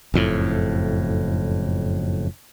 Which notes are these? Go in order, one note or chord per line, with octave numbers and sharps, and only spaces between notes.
F#1 F2 A2